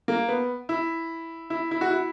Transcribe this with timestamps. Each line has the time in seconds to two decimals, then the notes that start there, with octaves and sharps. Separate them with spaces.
0.08 A#3
0.29 B3
0.69 E4
1.50 E4
1.71 E4
1.81 F#4
1.91 E4